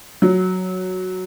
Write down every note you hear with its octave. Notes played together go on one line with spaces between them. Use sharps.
F#3